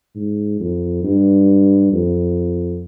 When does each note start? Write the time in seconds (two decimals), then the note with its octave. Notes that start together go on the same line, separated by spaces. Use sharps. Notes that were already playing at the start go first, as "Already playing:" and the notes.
0.15 G#2
0.60 F2
1.04 G2
1.93 F2